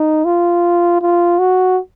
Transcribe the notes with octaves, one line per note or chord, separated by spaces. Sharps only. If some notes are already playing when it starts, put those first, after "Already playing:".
Already playing: D#4
F4
F4
F#4